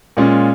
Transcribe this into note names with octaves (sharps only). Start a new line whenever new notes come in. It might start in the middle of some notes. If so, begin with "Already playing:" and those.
A#2 G#3 C#4 F4